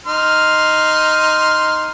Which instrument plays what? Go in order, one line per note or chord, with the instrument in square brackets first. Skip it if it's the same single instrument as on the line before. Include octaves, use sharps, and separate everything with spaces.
[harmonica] D#4 C6 F6